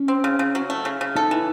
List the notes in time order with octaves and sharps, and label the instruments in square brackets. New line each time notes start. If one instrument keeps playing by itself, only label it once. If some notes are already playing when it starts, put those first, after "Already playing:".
Already playing: [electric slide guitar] C#4
[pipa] C4
C#3
C#3
F#3
A3
C#3
C#3
[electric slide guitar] D#4 [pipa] A4
[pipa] E3